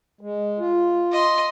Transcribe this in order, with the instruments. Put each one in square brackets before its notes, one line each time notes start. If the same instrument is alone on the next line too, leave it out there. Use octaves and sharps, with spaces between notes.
[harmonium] G#3
F4
[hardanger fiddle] D#5 C6